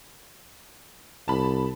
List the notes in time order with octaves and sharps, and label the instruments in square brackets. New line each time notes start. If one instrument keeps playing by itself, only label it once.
[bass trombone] C2 [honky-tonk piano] A5 B5